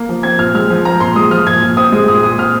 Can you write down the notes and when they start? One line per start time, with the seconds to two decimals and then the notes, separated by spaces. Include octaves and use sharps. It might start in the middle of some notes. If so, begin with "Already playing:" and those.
Already playing: A#3
0.09 F3
0.23 C4 G#6
0.38 A#2 F6
0.54 G#3 F6
0.70 F3
0.85 C4 A#5
1.00 A#2 C6
1.16 G#3 D#6
1.31 F3 F6
1.46 A#2 G#6
1.62 A#2
1.77 C4 D#6
1.92 G#3
2.08 A#2 D#6
2.23 A#2 D#6
2.39 C4 F6